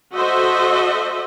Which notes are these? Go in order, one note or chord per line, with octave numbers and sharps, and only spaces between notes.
F#4 A4 C5 D#5 E5